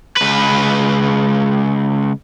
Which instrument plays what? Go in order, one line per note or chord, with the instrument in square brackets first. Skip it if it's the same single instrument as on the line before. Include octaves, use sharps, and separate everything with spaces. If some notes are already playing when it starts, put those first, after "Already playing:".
[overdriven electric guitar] C#2 B4